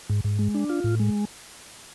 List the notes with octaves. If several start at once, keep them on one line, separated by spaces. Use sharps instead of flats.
G#2
G#2
G#3
D4
F4
A2
G#3